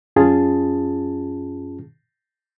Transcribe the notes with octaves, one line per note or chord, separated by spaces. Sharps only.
F#2 C#4 F4 G#4 A5